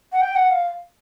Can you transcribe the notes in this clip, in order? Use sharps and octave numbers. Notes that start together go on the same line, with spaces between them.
F#5
G5
F#5
F5